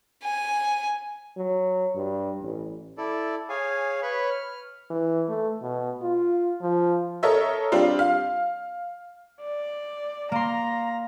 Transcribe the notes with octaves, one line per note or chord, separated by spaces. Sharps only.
G#5
F#3
G2
A1
E4 A4 D5
G#4 C#5 F5 G#5
B4 C#5 B5 C#6
F6
E3
A3
B2
F4
F3
A4 A#4 C#5 D#5 E5
G3 C4 D4 F4
F5
D5
A#3 A#5 C6